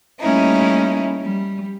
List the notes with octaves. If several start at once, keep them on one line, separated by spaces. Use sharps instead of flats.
G3 A3 A#3 C#4 D#4 E4
G3